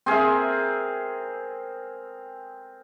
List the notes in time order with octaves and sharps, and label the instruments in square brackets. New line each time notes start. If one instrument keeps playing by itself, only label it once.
[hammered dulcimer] C4 G#4 A#4 E5